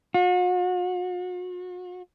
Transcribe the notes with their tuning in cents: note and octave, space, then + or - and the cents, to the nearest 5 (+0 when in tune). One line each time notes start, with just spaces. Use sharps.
F#4 -40